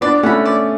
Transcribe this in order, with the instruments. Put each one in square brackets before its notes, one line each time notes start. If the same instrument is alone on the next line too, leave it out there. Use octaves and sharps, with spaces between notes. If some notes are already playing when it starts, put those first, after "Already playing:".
[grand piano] B3 D4 [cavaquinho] D5
[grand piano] A3 C#4 [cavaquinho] F#5
[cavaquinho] B5
D5